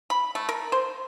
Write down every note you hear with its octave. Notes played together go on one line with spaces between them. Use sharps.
B5
A3
A#4
C5